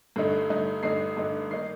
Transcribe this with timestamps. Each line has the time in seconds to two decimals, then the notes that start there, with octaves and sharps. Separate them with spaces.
0.16 G2 D3 A3 D#4
0.50 G2 D3 A3 D#4
0.83 G2 D3 A3 D#4 C7
1.17 G2 D3 A3 D#4
1.50 D#3 A#3 D#4 C7